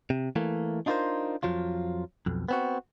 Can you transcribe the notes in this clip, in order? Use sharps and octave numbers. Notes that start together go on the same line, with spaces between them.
C3
E3 A3 A#3
D4 D#4 F4 A4 A#4 C5
F2 F3 F#3 F4
B1 F2
B3 C4 F#4